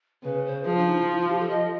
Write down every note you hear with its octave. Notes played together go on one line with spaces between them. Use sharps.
C#3 B4
C5
F3 G#4
D4
D#4
E4
F4
F4
G4
A4
D#5